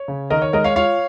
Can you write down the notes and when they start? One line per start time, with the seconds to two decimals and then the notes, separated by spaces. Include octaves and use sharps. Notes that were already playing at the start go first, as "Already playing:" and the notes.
Already playing: C#5
0.08 C#3
0.30 D#3 A#4 D#5
0.42 C#5
0.53 G#3 A#4 D#5
0.64 C#5 F5
0.76 F4 C#5 F5